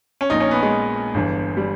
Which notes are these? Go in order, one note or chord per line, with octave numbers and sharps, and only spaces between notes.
C#4
A#1 A#2 D#4
C#4
B3
G#3
G1 G2 E3
G3